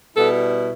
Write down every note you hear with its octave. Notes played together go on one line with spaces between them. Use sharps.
B2 G3 B3 E4 A4